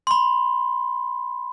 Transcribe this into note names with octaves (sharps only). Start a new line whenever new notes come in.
B5 C6